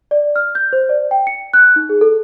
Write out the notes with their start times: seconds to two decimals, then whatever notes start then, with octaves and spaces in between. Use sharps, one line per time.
0.11 D5
0.36 F6
0.55 G6
0.73 C5
0.89 D5
1.11 G5
1.27 C#7
1.54 F#6
1.76 D#4
1.89 G#4
2.01 A4